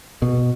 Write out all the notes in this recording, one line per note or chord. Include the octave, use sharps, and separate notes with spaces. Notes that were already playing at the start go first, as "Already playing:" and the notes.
B2